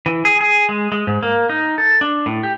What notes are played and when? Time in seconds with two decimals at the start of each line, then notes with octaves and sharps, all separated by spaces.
0.06 E3
0.25 G#4
0.41 G#4
0.69 G#3
0.92 G#3
1.07 G#2
1.23 A#3
1.49 D#4
1.78 A4
2.01 D4
2.26 A2
2.43 G4